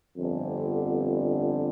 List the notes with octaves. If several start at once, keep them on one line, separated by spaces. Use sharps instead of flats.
G1 F2 D3